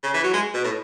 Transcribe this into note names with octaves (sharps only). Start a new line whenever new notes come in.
C#3
E3
F#3
G#3
B2
A2